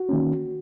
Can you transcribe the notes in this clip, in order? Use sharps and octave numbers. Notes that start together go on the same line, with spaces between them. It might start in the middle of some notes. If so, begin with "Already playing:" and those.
Already playing: F#4
D#3 A#3 C#4